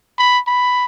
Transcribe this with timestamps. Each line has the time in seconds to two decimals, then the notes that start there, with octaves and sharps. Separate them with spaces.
0.18 B5
0.47 B5